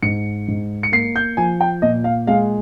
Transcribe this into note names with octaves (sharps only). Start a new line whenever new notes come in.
G#2 C#7
G#2
C#7
A#3 C7
G6
F3 G#5
G5
A#2 D#5
F5
G#3 F5